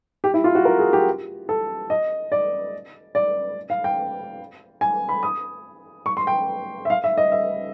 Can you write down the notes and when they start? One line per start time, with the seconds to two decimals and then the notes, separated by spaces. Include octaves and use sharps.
0.24 G4
0.34 E4
0.44 F4
0.55 F#4
0.65 A#4
0.79 G#4
0.93 G4
1.49 A4
1.90 D#5
2.32 D5
3.15 D5
3.70 F5
3.84 G5
4.81 G#5
5.09 B5
5.23 D#6
6.06 C#6
6.17 C6
6.27 G5
6.85 E5
6.90 F5
7.04 E5
7.18 D#5
7.32 E5